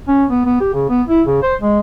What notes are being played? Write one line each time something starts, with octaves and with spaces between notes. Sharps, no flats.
C#4
B3
B3
G4
C#3
B3
E4
C#3
C5
G#3